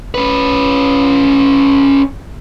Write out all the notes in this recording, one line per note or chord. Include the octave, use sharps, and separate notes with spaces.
C#4 B4